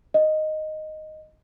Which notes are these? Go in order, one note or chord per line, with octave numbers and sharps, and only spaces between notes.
D#5